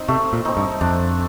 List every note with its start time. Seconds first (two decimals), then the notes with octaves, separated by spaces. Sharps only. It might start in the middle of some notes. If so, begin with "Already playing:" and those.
Already playing: C4 D#4
0.08 C3 A3
0.33 A#2
0.45 C4 D#4
0.57 G2
0.81 F2 D4